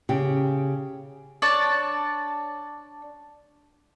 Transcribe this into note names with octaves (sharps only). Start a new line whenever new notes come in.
C#3 G4
D4 C#5 D5 A5